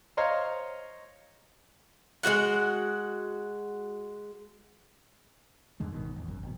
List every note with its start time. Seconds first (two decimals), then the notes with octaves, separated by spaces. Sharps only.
0.17 C5 C#5 D#5 F5 A#5 C6
2.23 G#3 C#4 F#4 F#5
5.80 E2 G#2 D3 G#3
5.92 G#1 B2 D#3
6.16 A1 E2
6.28 G#1 F#2
6.43 A1 B2